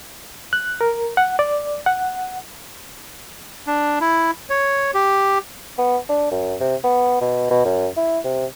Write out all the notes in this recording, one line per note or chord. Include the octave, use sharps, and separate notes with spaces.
F#6
A#4
F#5
D5
F#5
D4
E4
C#5
G4
B3
D4
F#2
C3
B3
B2
B2
F#2
E4
C3